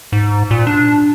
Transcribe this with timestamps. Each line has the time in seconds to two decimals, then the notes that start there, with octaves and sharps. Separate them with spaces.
0.12 G#2
0.51 A#2
0.67 D4